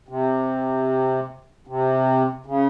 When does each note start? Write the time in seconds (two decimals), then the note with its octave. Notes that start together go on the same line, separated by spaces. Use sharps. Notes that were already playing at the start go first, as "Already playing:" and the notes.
0.09 C3
1.67 C3
2.46 C#3